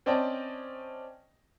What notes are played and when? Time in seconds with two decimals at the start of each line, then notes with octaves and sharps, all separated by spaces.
0.06 C4 C#4 D5 D#5 G5 A5